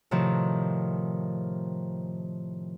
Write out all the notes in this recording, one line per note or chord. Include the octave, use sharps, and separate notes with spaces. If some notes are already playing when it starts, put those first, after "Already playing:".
A2 C3 D#3 F3